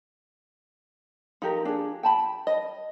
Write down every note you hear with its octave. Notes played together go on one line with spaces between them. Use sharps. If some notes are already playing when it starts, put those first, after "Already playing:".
F3 D#4 G4 A#4
D4 G#4
G5 A5 B5
D#5